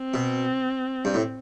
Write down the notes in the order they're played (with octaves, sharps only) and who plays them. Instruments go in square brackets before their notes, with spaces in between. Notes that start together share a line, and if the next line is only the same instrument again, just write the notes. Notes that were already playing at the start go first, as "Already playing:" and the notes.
Already playing: [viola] C4
[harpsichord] B2
G2
A2